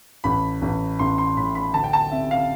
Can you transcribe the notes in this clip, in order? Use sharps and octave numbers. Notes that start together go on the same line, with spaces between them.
A1 B5
A1
A1 C6
C6
A2 B5
B5
D2 A5
G5
A5
C3 E5
F5